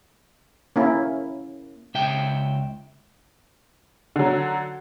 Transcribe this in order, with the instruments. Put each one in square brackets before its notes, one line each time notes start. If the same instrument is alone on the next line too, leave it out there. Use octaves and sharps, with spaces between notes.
[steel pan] A#3 C#4 E4
[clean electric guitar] C#2 E5 G5
[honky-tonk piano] D3 F#3